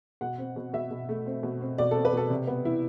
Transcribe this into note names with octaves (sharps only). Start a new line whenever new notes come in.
B2 F#5
C4
B2
B2 E5
B2
A3
C4
B2
C4
B2 D5
C4 A4
B4
B2 A4
C3
B3
E4